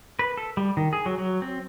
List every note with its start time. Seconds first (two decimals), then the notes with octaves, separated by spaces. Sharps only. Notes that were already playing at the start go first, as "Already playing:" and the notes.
0.19 B4
0.37 A4
0.57 G3
0.77 D#3
0.93 G#4
1.06 F#3
1.18 F#3
1.42 C4